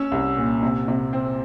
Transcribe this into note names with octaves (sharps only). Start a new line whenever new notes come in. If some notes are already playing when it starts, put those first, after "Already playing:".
Already playing: C#4 E6
C2
A#2
C3
C3
C4